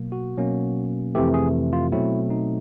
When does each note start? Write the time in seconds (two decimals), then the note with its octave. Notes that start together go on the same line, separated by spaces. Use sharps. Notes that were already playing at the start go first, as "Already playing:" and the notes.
Already playing: B2 F#3 A#3
0.12 F#4
0.38 B2 F#3 A#3 C#4
1.15 F2 C3 E3 A3 G4
1.34 G#4
1.73 F4
1.92 B2 F#3 A3 C4 E4
2.30 D#4